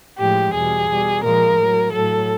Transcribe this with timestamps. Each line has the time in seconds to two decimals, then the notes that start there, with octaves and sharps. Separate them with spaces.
0.19 A2 F3 G#3 G4
0.54 E2 B2 G3 G#4
0.89 B2 G3
1.23 A#2 F3 G#3 A#4
1.58 A2 F#3
1.93 A2 F#3 A4